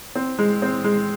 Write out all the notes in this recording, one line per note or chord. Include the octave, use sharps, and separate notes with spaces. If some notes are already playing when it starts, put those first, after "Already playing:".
C4
G#3
C4
G#3